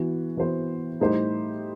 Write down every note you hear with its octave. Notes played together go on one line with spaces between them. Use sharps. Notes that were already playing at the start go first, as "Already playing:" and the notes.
Already playing: E3 B3 F#4
E3 B3 F#4 C5
A2 G3 D#4 G4 C5